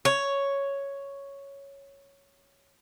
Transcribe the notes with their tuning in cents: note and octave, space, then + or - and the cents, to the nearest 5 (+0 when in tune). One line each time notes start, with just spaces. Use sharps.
C#5 +0